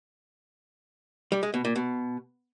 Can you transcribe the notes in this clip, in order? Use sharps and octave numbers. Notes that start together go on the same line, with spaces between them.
G3
G#3
B2
A#2
B2